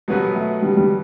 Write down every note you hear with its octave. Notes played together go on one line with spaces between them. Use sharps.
B2 F#3 G3 B3 F#4 B4
A3
G3
G3